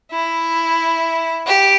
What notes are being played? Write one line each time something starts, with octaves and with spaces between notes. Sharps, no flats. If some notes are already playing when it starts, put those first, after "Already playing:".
E4
G4